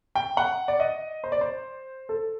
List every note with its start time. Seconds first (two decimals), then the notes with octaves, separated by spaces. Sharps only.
0.15 G5
0.37 F#5
0.68 D5
0.80 D#5
1.24 C5
1.32 D5
1.41 C5
2.09 A4